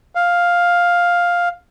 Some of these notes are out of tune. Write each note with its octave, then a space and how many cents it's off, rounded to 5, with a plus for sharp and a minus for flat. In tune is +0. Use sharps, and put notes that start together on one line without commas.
F5 +5